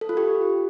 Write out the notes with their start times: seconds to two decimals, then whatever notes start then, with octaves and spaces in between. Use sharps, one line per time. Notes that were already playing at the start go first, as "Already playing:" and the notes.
0.01 A4
0.09 F4
0.17 G4